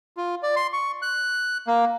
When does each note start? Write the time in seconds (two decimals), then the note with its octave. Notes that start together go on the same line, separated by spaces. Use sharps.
0.17 F4
0.43 D5
0.56 C6
0.73 C#6
1.02 F#6
1.67 A#3